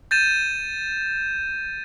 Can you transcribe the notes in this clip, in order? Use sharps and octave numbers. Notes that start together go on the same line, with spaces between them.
G6 A6 D#7 E7